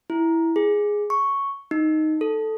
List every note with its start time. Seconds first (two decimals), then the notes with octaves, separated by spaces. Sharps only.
0.10 E4
0.56 G#4
1.10 C#6
1.71 D#4
2.21 A4